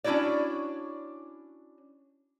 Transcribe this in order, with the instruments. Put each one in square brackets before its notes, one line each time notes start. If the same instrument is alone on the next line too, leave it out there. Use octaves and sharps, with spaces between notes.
[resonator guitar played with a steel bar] C#4 D4 E4 F#4 C#5 D5